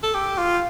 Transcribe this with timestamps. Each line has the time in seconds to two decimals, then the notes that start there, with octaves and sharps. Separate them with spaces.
0.03 A4
0.15 G4
0.38 F4